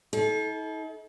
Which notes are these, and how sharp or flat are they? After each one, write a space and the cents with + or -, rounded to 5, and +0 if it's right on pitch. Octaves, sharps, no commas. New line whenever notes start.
D#4 +45 A4 -35